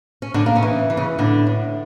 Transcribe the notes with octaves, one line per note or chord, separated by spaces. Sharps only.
C#4
A2 D3 D4
A#3
C#3 C#4
E3
E3
C#3 C#4
A2 D3 D4
A2